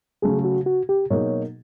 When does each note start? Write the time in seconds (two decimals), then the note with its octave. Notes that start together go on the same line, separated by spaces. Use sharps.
0.22 C#3 F#3 A3 G#4
0.45 F#4
0.66 F#4
0.89 G4
1.10 B2 F#3 A#3 D#4 G#4 C#5